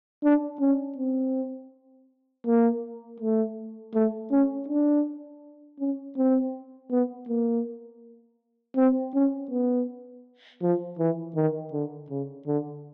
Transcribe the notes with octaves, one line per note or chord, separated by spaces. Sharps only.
D4
C#4
C4
A#3
A3
A3
C#4
D4
C#4
C4
B3
A#3
C4
C#4
B3
F3
E3
D#3
D3
C#3
D3